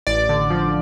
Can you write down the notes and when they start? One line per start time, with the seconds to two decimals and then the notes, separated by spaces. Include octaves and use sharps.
0.07 A1 D5
0.29 D3
0.50 F3